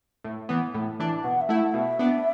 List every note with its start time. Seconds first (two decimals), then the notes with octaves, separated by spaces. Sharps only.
0.24 A2
0.49 E3 B3
0.74 A2
1.00 E3 D4
1.24 B2 F#5
1.41 E5
1.49 A3 E4
1.58 F#5
1.74 B2 E5
1.99 B3 D4